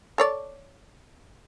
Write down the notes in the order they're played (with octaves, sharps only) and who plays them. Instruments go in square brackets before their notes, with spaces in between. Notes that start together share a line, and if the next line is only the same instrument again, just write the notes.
[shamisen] A4 C#5 D5